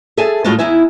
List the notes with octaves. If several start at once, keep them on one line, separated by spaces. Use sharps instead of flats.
G#4 A4 E5 G#5 A5
A2 G3 G#3 F4 F#4 A5
E2 D#4 E4 E5 G#5